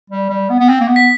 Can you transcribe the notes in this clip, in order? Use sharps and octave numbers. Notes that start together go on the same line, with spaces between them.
G3
G3
B3
B3
C4
A#3
B3
B6